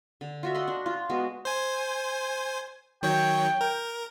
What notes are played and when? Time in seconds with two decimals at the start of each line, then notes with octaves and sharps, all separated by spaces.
0.21 D3
0.43 F4 F#4 E5
0.55 D#5 F#5 B5 C6
0.67 D4
0.86 F4
1.09 G#3 B3 F#4
1.45 C5 G#5
3.03 D#3 F#3 C#5 G5
3.61 A#4